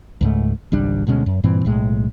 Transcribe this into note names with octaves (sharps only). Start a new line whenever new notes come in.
C#2 G#2 A3
G#1 C#2 G3 D4
D2 B2 G#3 C#4
F#2
G2 A#2 E3 C4
B1 A2 G#3